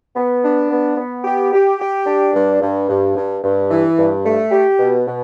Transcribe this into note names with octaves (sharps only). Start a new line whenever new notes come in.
B3
D4
B3
B3
G4
G4
G4
D4
G2
G2
G2
G2
G2
E3
G2
A3
G4
B2
B2